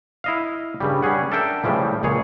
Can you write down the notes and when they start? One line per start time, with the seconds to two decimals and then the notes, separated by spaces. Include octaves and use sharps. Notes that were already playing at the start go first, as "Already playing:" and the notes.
0.24 E4 D#5 F5
0.80 G2 C#3 G3
1.02 G3 C#4 G#4 F#5
1.31 D4 A4 A#4 E5 G5
1.64 A2 C#3 E3 F3 G3
2.03 C#2 A#2 G#4 C#5